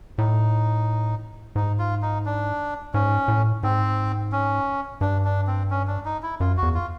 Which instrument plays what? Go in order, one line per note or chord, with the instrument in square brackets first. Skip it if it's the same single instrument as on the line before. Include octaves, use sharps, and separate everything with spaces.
[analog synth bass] A2 [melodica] D#4
[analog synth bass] G#2 [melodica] D#4
[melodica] F4
D#4
D4
[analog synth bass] G#2 [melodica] C#4
[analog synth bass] A2
[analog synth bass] G#2 [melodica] C4
[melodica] C#4
[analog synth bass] G2 [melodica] D4
[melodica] D4
C4
C#4
D4
D#4
E4
[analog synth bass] F#2 [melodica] F4
[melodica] F#4
[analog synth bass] E2
[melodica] F4